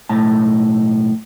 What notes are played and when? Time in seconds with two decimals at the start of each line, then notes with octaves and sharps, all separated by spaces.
0.09 B1 A2 A5